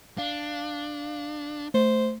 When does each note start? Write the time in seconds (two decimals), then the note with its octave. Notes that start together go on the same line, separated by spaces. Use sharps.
0.18 D4 F5
1.74 A3 C5